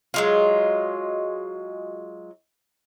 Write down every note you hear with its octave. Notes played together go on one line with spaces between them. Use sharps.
F#3 G#3 F4